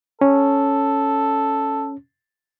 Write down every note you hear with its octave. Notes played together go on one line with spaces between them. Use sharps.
C#4 A4